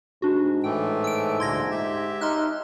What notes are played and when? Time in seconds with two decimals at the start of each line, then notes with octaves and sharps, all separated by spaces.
0.22 G#2 D4 F#4
0.64 A2 E3 A3 G5
1.04 E6 D7
1.40 D2 A#2 C6 G#6 A#6
1.71 G4 E5
2.21 D#4 C6 F6 F#6